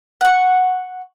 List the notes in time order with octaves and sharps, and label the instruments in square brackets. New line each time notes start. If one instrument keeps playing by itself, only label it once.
[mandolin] F#5 C#6